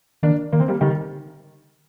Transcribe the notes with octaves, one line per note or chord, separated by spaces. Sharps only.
D#3 A#3 D4
D#3 A#3
C4
G3 A#3
D3 D#3 G3